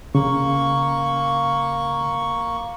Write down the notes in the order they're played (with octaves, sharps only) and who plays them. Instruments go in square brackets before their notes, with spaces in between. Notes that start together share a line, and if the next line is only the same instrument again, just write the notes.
[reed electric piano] C#3 [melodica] A#3 C#6